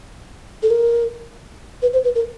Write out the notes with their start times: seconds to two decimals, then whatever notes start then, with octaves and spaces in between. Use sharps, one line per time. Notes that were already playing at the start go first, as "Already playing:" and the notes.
0.63 A4
0.70 A#4
1.82 B4
1.93 C5
2.04 B4
2.15 A#4